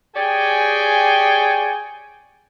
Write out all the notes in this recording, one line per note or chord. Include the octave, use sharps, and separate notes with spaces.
G4 G#4 C#5 D5 G5 G#5